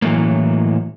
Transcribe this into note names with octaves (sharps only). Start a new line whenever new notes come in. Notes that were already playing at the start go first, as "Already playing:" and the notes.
A2 E3 F#3 G3 A3 A#3